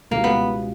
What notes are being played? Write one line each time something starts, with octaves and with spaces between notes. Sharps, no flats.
C#2 B2 G3 A#3 C#4 E4
B3